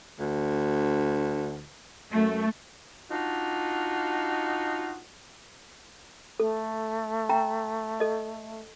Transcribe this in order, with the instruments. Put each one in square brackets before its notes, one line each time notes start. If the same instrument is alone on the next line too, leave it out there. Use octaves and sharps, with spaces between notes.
[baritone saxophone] D2
[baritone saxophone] F#2 [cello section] A3
[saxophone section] D4 D#4 F4 F#4
[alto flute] A3 [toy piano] A4
[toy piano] G5 A#5
A4 D#5